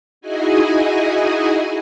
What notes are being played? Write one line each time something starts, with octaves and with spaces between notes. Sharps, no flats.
D#4 E4 F#4 G#4 D#5 G#5